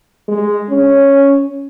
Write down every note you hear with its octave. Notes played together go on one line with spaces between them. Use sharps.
G#3
C#4